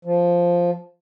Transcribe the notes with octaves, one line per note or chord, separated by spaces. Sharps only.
F3